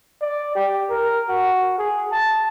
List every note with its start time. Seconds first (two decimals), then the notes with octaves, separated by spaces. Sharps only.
0.22 D5
0.55 G4
0.89 A#4
1.29 F#4
1.78 G#4
2.11 A5